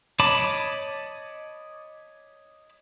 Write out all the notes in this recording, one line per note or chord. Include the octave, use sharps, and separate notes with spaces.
C#5 D#5 A5 B5 D6